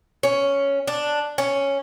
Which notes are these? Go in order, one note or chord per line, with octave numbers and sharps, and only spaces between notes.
C#4
D4
C#4